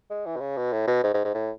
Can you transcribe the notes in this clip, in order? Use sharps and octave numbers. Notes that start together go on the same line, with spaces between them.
G#3
E3
B2
C#3
B2
A2
B2
G#2
G#2
G#2
A2